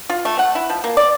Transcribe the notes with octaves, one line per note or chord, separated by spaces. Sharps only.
F4
A3
F#5
E4
F3
A#3
D5